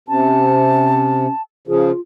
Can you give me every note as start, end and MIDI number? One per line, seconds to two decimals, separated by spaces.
0.09 1.27 48
0.09 1.32 61
0.09 1.42 81
1.68 1.91 49
1.68 1.91 53
1.68 2.00 65
1.68 1.91 68